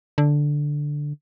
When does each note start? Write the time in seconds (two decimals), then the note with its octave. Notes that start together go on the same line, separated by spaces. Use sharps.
0.18 D3